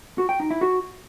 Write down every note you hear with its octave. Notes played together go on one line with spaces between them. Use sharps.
F#4
G5
D#4
E4
F#4